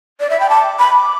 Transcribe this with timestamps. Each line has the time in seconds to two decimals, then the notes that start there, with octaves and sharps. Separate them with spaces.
0.20 D5
0.30 E5
0.38 G5 B5
0.49 A5 D6
0.79 B5